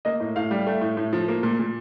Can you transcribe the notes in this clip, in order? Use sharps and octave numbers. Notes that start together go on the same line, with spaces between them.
A#3 D#5
A2
A2 F5
G3
A3
A2
A2
F3
A#3
A#2
A#2